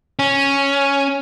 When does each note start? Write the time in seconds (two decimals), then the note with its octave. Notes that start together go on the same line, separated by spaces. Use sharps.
0.19 C#4